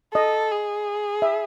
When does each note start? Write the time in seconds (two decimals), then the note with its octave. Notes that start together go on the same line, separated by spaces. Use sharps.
0.14 A4 D#5
0.51 G#4
1.22 E5